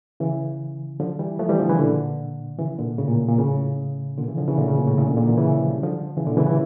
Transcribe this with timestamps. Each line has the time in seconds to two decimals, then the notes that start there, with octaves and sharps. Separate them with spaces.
0.20 C#3 E3
1.00 D3 F3
1.19 E3 G3
1.39 F3 A3
1.49 E3 G3
1.59 D3 F3
1.69 C#3 E3
1.79 A#2 D3
2.59 C#3 E3
2.79 A#2 D3
2.98 A2 C#3
3.08 A#2
3.28 A#2
3.39 A2 C#3
4.18 A#2 D3
4.28 C#3 E3
4.38 D3 F3
4.47 C#3 E3
4.58 A#2 D3
4.68 A2 C#3
4.77 A#2
4.88 A2 C#3
4.98 A2 C#3
5.07 A#2 D3
5.17 A#2 D3
5.27 C#3 E3
5.37 C#3 E3
5.57 F3
5.71 G3
5.83 D3 F3
6.17 C#3 E3
6.27 A#2 D3
6.37 C#3 E3
6.47 E3 G3